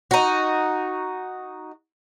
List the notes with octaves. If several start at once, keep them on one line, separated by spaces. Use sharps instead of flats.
D#4 F#4